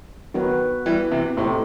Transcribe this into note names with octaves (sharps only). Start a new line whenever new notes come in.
D#3 F#3 B3 F#4 B4
E3 G3
C3 E3
A2 C3 A3 D#4 G4 C5